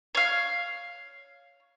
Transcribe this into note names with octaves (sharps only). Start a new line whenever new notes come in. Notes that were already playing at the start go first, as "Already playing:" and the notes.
C#5 F5